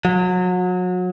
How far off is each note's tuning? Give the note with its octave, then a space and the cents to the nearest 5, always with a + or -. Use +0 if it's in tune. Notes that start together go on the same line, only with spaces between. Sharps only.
F#3 -30